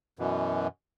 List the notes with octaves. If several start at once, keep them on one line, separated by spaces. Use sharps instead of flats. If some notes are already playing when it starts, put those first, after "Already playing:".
F#2 B2 E3